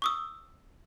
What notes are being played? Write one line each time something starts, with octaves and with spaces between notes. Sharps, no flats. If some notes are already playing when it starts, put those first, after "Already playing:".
C#6 D#6 E6